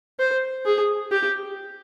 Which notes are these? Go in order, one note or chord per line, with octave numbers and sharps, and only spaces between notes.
C5
G#4
G4